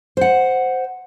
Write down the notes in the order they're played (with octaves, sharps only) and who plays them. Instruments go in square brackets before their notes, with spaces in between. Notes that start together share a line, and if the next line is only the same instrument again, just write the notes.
[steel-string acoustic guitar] C5 F#5